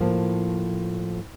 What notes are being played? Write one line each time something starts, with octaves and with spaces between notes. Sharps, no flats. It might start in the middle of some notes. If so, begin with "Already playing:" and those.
A2 F3 A#3